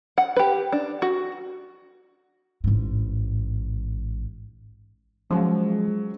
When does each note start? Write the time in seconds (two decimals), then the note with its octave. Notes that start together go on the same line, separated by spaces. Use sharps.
0.18 F#5
0.36 G4 B4
0.72 D4
1.02 F#4
2.64 A1 G#2
5.31 F3 F#3 G#3 C#4